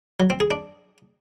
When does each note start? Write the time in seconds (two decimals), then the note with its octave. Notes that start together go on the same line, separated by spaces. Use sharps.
0.20 F#3
0.30 C4
0.40 G#4
0.51 D4